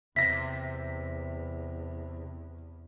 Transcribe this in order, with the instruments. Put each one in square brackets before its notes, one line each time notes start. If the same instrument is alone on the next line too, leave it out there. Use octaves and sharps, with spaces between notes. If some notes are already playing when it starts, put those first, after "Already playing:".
[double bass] E2 [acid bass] C3 [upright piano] E5 A#6 [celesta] B6